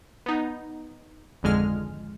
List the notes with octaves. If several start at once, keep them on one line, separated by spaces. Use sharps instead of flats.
B3 D#4
G#1 F2 D3 G#3 G#5 F6